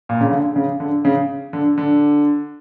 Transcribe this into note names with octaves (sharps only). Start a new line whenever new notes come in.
A#2
C#3
D3
C#3
D3
C#3
D3
D3